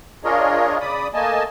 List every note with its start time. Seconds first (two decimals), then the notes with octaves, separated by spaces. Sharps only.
0.24 D4 F4 G#4 A#4 C#5 D#5
0.81 C#3 D5 B5 D#6
1.14 A3 A#3 D#5 G#5 A5